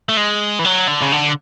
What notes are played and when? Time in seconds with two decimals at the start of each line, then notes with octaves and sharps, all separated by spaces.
0.09 A3
0.17 G#3
0.59 E3
0.65 F#3
0.88 D3
1.02 C#3
1.12 D3